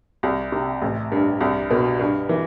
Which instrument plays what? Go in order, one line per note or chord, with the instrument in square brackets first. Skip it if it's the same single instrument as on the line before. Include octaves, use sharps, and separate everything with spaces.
[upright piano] C2
C3
A1
G2
C2
B2
G2
E3